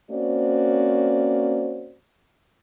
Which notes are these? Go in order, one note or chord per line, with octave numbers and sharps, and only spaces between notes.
A#3 C4 C#4 F#4 C5 D5